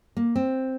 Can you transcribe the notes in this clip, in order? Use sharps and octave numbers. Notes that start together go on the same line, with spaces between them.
A#3
C4